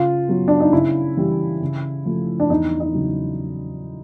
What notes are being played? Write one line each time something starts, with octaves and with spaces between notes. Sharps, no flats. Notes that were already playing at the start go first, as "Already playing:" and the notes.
Already playing: C#3 F4
F#3 B3
D4
D#4
C#3 E4
E3 G3
C#3
F3 A3
D4
E2 D#4
D#4
C#3 F#3